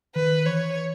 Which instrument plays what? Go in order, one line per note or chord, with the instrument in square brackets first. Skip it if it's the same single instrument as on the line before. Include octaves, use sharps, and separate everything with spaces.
[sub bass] D#3 [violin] B4
[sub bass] E3 [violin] C#5